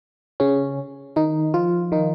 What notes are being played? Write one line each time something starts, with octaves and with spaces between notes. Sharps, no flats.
C#3 C#4
D#3 D#4
F3 F4
D#3 D#4